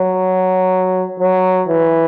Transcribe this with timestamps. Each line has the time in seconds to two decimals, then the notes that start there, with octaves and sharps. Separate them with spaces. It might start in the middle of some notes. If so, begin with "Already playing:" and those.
Already playing: F#3
1.20 F#3
1.68 E3